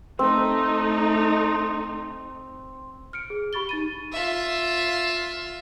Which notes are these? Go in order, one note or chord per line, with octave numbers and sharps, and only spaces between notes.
A3 C4 D#4
F6 C#7 D7
G#4
G4 B5 C#6 A6 G7
D#4 A6 D#7
F4 E5